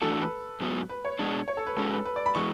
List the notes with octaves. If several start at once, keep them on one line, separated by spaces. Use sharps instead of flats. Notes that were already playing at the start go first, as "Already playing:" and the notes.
E3 A3 D4 F#4 A4
A4
B4
G#2 F#3 B3
B4
C#5
B2 G#3 D4
C#5
A4
B4
G#2 G#3 C#4 F#4 A4
B4
B4
D5
B5
E3 G#3 B3 C#6